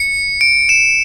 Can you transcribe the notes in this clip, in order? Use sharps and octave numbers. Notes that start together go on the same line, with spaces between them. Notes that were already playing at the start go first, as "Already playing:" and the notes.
Already playing: C#7
D7
E7